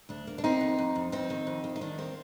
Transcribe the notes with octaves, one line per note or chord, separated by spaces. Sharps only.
D2 D4
A#3
D4
A#3 C4 D#4
F2
F2
F2
F2 C4 D#4
D#3
F2
D#3
D#4
D#3 D4
A#3 C4